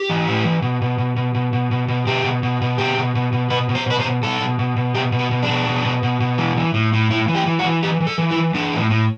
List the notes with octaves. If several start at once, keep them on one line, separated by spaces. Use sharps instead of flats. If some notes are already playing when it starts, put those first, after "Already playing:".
Already playing: G4
E3
A2
E3
B2
B2
B2
B2
B2
B2
B2
B2
B2 G4
B2
B2
B2
B2 G4
B2
B2
B2
B2 B4
B2
C5
B2 B4
C5
B2
B2 A4
B2
B2
B2
B2 G4
B2
F#4
B2
D4
B2
B2
B2
B2
B2
E3
E3
A2
A2
A2 E4
E3
G4
E3
F#4
E3
E3 G4
E3
A4
E3
E4
E3
E3 D4
A2
A2